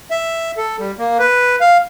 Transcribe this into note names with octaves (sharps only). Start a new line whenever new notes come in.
E5
A4
G3
A#3
B4
F5